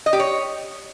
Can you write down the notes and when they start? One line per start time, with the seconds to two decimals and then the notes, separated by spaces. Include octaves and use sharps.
0.06 D#5
0.13 G4
0.19 C#5